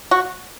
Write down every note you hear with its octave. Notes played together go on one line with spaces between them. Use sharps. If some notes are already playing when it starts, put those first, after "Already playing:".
F#4